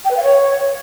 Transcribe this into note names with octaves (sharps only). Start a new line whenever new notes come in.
G5
B4
F5
C#5